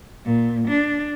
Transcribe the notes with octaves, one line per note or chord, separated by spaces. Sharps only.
A#2
D4